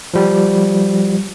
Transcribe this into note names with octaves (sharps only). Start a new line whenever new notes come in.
F3 G3